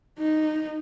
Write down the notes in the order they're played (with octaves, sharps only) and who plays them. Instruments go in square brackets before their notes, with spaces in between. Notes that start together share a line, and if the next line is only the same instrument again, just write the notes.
[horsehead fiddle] D#4